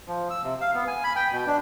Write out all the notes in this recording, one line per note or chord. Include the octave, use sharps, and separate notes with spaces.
F3
E6
C3
F5
B3
G#5
B5
G5
B2
D4